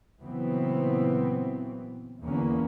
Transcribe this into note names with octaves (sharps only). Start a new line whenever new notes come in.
A#2 C#3 E3 F#3 B3 C4
E2 D3 E3 A#3 B3 C#4